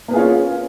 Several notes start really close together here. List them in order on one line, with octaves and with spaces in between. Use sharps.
A#3 B3 G#4 F4 C#4